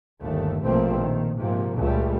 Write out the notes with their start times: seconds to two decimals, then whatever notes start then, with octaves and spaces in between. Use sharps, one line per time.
0.21 G1 D#2 A3
0.64 A#1 B2 F3 A3 A#3 C4
0.98 D#3
1.37 G#2 C3 F3 A#3
1.76 C#2 A#2 C#3 G3 A3